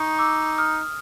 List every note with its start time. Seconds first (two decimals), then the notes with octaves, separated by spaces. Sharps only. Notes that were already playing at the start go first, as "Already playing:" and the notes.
Already playing: D#4 C#6 D#6
0.18 D6 E6
0.58 D#6 F6